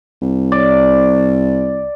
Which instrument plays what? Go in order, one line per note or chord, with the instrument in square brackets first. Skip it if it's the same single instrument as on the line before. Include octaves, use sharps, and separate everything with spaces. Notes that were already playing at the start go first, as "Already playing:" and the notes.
[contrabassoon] C2
[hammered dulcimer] D5